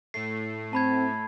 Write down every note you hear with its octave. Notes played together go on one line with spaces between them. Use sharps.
A2 A3 C7
C4 A5 B5 G#6